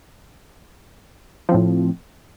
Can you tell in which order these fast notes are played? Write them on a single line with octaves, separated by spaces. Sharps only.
F3 C4 A2